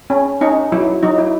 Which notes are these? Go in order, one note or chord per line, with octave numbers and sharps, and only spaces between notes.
C#4
C#4 D#4
F#3 E4
F#3 D#4
E4